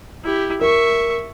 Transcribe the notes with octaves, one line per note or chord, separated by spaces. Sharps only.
E4 G4
A#4 E5 C#6